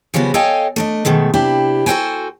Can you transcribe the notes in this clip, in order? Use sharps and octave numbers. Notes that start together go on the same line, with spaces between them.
C#3 F3 G3 B3 F#4
A4 C#5 D#5 F5 G5 G#5
A3 D4 D#5
B2 D#3 G#3 A3
C3 D4 E4 G4
F#4 A4 B4 C5 G5 G#5